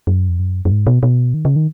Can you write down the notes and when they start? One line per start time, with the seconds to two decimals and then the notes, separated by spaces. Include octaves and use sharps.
0.07 F#2
0.29 F2
0.39 F#2
0.65 F#2
0.71 G#2
0.87 B2
1.03 B2
1.34 D#3
1.45 C#3
1.56 D#3